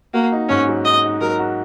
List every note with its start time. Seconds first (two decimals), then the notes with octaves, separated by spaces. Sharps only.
0.14 A#3 F#4
0.32 D#4
0.49 G#2 C#4
0.67 F#3
0.85 D#4 D#5
1.03 D#4
1.21 F#3 A#4
1.39 F#4